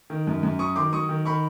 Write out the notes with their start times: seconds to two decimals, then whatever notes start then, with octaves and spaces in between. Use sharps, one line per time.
0.10 D#3
0.27 F#2
0.43 F#2
0.59 F#3 C#6 D#6
0.76 D#3 C6 D6
0.93 F#3 C#6 D#6
1.09 D#3
1.25 D#3 B5 C#6